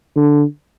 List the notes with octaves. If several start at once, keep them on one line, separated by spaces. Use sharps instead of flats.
D3